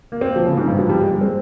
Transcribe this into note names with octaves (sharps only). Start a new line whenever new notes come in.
A#3
C4
F3
C#3
G#2
G2
F3
G3
G#3
G#3
C4